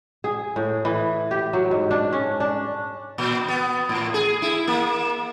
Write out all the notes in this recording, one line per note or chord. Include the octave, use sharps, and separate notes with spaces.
G#4
A2
E3
G4
F#3
G#2
D4
C#4
D4
A#2
B3
A2
G#4
E4
A#3